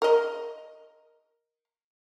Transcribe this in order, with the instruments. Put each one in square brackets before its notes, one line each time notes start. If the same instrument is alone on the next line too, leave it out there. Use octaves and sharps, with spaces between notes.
[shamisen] A#4 D#5